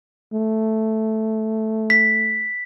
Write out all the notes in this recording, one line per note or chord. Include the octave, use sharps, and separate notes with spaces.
A3
B6